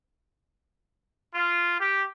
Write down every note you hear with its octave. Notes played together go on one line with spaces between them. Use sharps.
F4
G4